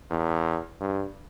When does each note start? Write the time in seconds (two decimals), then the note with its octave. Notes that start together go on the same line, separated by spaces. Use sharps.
0.10 E2
0.81 G2